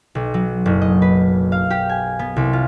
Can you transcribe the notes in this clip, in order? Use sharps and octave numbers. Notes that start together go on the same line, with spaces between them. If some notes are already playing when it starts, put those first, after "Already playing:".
B1
F#3
F#1
D#5
B4
F5
G4
G#5
B3
C2
F4